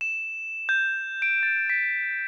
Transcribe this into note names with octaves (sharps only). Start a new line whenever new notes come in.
E7
G6
D7
A6
B6